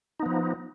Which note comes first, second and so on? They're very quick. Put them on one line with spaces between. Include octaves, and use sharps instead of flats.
D#4 B3 F3